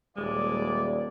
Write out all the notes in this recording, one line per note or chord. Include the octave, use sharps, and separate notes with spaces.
D#1 G#3 E4 D5